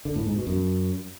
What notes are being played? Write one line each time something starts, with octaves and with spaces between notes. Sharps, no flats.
D3
A2
G#2
B2
F#2